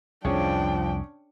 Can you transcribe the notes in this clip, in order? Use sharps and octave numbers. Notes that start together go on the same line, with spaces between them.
C2 F2 F3 C#4 D4 G#4 C#5 G5